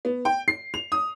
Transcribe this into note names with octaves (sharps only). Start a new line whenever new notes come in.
B3
G5
C7
F7
D#6